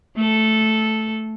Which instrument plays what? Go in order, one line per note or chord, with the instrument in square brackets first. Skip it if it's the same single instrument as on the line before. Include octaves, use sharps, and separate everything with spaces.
[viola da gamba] A3 A4